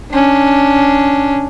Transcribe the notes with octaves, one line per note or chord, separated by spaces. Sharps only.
C#4 D4